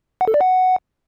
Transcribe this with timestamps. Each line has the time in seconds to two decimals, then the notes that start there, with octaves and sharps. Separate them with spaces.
0.21 F#5
0.28 A4
0.34 D5
0.41 F#5